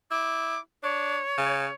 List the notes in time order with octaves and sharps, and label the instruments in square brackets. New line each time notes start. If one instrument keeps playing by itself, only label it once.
[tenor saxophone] E4 [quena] D6
[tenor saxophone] D4 [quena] C#5
[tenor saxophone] C#3